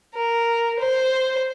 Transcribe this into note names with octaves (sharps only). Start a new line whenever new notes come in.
A#4
C5